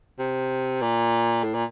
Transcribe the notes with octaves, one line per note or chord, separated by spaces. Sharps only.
C3
A#2
A2
A#2